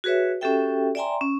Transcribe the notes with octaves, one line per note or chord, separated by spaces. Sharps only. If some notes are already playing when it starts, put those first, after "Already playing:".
F#4 G#4 B4 C#5 E5
C#4 F#4 G4 A4 E5 G5
D5 E5 G5 G#5 A#5 C6
C#4